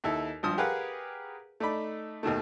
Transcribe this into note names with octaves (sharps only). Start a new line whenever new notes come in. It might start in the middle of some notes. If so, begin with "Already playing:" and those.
D#2 D#4 E4 A4
G#1 G2 F3 D#6 F6
G4 G#4 A#4 B4 F5 F#5
A3 D#4 D5 B5
D#2 B2 D#3 A3